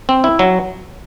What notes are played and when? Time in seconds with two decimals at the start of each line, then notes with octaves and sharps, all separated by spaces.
0.09 C4
0.24 E4
0.39 F#3